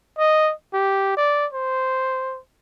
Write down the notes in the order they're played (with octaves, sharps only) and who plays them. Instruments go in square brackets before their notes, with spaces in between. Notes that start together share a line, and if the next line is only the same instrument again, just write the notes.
[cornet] D#5
G4
D5
C5